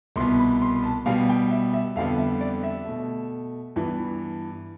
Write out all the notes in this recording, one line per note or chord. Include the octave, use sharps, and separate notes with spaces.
C2 B2 B3 C6
B5
C6
A5
B2 G3 B3 F5
G5
E5
E5
F2 D3 G3 B3 F5
E5
D5
E5
B2 A3
G2 E3 B3